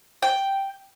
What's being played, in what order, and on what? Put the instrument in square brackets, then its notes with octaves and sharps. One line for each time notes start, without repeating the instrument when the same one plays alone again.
[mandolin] G5